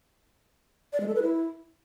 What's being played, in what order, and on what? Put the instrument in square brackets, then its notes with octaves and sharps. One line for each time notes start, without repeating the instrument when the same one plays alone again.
[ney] D5
G#3
A4
B4
E4